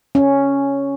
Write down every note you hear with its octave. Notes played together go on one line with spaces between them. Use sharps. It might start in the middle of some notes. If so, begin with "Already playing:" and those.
C#4